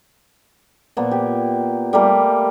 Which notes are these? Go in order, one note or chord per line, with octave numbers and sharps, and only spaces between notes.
A#2 F3 A#3 B3
G4
G3 A3 A#3